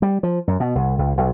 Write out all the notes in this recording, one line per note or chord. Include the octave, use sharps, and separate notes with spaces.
G3
F3
F#2
B2
C2
C#2
B1